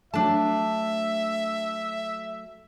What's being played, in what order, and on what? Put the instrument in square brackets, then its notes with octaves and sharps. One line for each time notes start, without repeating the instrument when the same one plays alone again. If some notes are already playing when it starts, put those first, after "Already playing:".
[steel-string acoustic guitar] F#3 A3 [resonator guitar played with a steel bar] D4 A5 [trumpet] E5